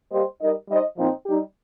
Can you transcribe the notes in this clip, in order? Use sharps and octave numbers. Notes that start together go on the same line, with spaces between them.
G3 A#3 G4 C5 D#5
G3 D#4 A#4 D#5
G3 D#4 C5 D#5
A#2 F3 C4 D#4
G3 D#4 G4